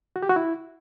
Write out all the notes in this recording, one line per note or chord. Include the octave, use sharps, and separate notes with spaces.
F#4
G4
F#4
E4